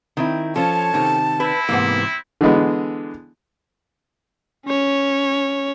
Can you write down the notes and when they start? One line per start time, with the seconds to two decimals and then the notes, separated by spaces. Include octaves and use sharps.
0.17 D#3 C4 E4
0.56 F3 C#4 F4 A4 C#5 A5
0.94 C3 D#3
1.40 C4 E4 B4
1.69 G#2 C3 E3 A#3 B3
2.41 D3 E3 G#3 B3
4.67 C#4 C#5